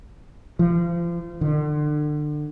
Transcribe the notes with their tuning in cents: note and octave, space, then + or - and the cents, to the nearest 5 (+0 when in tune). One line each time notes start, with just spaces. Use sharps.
F3 -35
D3 +30